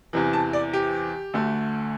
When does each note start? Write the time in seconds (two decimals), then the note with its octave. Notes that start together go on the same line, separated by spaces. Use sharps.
0.13 E2 C3 E3
0.33 A5
0.53 D5
0.73 G4
1.34 D2 D3 A3